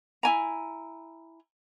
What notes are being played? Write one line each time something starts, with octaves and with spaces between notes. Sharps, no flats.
E4 G#5 A#5